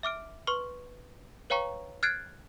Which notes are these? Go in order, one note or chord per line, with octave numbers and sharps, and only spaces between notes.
E5 D6 F6 D7
B4 C6 C#6 F6
B4 C#5 F5 G5 A#5 C#6
F6 F#6 G#6 A6 C7 D7